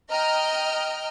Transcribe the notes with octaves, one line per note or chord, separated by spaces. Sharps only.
D#5 G5 A#5 F6